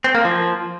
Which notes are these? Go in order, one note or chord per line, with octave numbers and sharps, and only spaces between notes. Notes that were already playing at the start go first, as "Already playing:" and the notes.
C4
A#3
F3